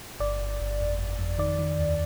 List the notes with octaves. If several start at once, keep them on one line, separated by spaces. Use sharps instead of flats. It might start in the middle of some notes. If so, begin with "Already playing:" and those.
G1 D5
G1
G1
F2
G1
F2
D#3 D5
D#3
D#2